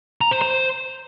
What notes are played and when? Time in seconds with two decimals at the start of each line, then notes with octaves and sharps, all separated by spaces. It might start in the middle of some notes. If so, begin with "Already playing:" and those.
0.21 A#5
0.31 C5
0.42 C5